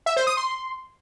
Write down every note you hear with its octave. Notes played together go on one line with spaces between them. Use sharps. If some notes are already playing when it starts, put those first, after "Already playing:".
E5
C5
D#6
C6